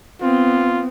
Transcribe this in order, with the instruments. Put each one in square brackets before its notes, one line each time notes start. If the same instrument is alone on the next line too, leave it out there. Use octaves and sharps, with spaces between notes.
[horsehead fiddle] B3 C4 [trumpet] F4